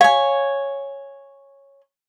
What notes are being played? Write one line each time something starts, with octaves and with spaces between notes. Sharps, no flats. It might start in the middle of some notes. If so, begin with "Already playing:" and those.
C#5 F5 G#5